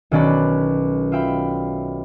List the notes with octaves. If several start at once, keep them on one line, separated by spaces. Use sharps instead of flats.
B1 D#3 C#4 D5 B5 F#6
F4 E5 G5 B5